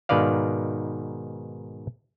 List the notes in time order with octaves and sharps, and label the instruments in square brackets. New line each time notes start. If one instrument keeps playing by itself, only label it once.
[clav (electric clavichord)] G#2 B2 D#3 B4 D5 F5